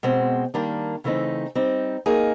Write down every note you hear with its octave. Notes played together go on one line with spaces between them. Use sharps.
B2 G#3 C4
D#3 G3 A#3 D4
C#3 E3 A3 C4 D#4
G3 C4 D#4
A#3 D#4 G#4